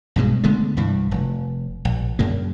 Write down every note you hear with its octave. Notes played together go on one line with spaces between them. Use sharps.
B1 G2 B2 G#3
D3 G#3 A3 B3
C2 G2 E3
F1
A#1
F#2 C#3 A#3